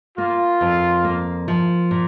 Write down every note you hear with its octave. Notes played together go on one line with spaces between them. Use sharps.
A#3 F4
F2
A#3
F3
A#2